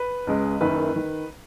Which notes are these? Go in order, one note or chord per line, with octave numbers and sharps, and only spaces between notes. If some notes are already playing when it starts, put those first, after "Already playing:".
Already playing: B4
C#2 C#3 G#3
F#1 F#2 D#3 B4
D#3